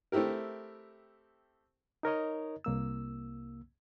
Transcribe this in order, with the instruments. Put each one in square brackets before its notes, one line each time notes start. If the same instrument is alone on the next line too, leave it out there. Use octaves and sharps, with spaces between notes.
[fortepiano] A3 C4 E4 G4 A#4
[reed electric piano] D#4 A#4 C#5 D#5
C2 A#3 E6